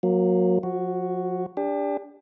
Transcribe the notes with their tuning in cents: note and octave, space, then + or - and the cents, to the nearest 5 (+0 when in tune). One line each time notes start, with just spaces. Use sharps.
F#3 -25 A#3 +0
F3 +35 F#4 +0
D4 -15 G4 +30